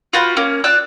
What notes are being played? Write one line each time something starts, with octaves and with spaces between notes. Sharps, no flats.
F4 F#4 B4 G5
A#3 C#4
F4 D5 E6 F#6